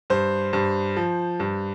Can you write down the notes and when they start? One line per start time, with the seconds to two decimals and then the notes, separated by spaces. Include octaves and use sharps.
0.10 G2 C5
0.53 G2
0.96 F3
1.40 G2